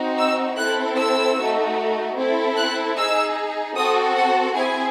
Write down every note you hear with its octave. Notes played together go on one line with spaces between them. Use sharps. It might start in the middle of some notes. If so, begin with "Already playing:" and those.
Already playing: C4 D#4 F#4
E6
C4 E4 A4 F#6
E6
A3 D#4 F#4
C4 E4 A4
F#6
D#4 G#4 E6
C4 F#4 A4 D#6
F#5
C4 E4 G#4 G#5